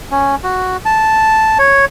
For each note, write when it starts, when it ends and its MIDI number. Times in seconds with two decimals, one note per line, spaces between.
0.11 0.35 61
0.44 0.77 66
0.85 1.58 81
1.59 1.85 73